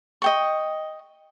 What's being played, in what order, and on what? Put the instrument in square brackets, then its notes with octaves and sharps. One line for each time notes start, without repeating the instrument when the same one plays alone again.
[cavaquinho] D#5 G5 C#6